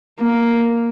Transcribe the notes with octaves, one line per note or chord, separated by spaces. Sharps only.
A#3